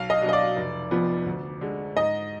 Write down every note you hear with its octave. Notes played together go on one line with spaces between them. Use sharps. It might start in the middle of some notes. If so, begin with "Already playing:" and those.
Already playing: B1 F5
D#5
B2 F#3 D4
D#5
D5
F1
F2 F3 B3 F4
D2
D3 G#3
G#2 D#5